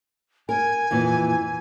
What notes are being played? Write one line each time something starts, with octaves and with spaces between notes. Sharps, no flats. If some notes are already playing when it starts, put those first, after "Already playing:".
A#4 G#5
F2 A#2 E3